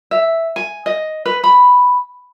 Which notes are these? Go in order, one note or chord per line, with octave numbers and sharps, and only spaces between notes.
E5
G#5
D#5
B4
B5